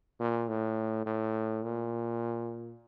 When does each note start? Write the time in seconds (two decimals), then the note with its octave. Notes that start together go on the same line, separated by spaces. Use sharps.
0.20 A#2
0.49 A2
1.06 A2
1.63 A#2